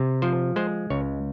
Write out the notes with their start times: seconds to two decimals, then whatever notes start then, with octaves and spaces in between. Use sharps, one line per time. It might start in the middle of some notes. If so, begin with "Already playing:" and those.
Already playing: C3
0.22 F3 C5
0.56 G#3 C5
0.90 C#2 C#5